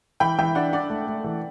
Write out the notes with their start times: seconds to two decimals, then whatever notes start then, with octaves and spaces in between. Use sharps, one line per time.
0.20 E3 G5 B5
0.39 E3 E5 G5
0.55 D4 D5 F#5
0.73 D4 D5 F#5
0.90 A3
1.07 A3
1.24 E3